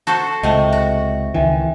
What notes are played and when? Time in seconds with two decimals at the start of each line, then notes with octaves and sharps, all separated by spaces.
0.07 F#4 A4 C5 A5 C#6 G6
0.43 C#2 C3 A3 D#5 G5 C#6
0.73 F#4
1.34 C#2 D#3 E3 E5 G5 G#5